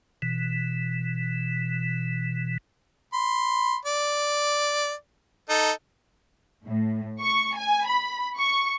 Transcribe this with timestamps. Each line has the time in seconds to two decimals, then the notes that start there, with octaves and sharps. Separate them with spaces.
0.22 B2 E3
3.13 B5 C6
3.85 D5
5.49 D#4 A4
6.66 A2
7.21 C#6
7.56 G#5
7.87 B5
8.38 C#6